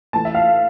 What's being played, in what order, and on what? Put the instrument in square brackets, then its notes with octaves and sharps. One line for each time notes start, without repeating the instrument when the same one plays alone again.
[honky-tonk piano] A2 E3 A3 A5
E5
F5